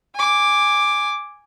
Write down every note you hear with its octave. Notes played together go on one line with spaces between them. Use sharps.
G#5 D6